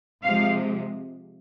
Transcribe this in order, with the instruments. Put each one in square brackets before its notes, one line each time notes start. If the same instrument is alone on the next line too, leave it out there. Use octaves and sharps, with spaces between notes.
[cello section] C3 F3 G#3 F5